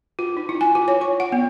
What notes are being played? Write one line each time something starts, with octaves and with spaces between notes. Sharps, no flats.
F4
D#4
E4
G#5
F4
C#5
C#6
F#5
B3